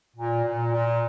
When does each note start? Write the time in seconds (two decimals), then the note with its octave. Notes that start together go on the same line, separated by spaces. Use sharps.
0.17 A#2
0.44 A#2
0.73 A#2